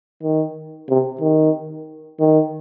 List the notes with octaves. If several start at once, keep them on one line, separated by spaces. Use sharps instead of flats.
D#3
C3
D#3
D#3